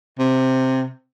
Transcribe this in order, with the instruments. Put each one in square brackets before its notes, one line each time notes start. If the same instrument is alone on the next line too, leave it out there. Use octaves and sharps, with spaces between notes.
[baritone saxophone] C3